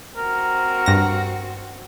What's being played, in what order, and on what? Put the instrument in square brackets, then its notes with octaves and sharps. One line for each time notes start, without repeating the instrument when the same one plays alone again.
[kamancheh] C4 F#4 [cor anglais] A#4
[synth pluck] G2 A#6